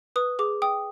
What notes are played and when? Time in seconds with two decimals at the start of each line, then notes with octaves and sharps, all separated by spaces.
0.16 B4 D#6
0.39 G#4 D6
0.62 G5 D#6